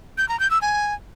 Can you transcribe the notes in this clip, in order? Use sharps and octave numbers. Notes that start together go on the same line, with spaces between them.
G6
A#5
G6
E6
G#5